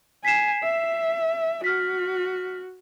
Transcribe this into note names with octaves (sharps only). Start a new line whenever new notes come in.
G#5 B6 C7 E7
E5
F#4 F6 B6